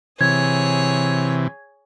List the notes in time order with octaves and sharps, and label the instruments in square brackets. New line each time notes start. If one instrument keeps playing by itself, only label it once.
[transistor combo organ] C3 E3 [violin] G#4 C#5 [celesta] G#6